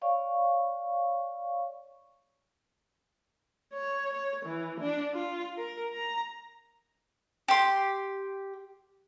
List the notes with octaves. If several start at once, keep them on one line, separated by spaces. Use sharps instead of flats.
C#5 D5 F5 C#6
C#5
C#5
E3
D4
F4
A#4
A#5
G4 C6